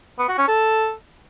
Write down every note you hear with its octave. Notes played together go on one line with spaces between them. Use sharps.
B3
F#4
C#4
A4